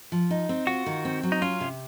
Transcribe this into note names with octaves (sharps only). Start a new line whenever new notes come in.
F3
D#4
C4
F4 F#4
D#3
C4
F#3
D#4
C#4 F4
C3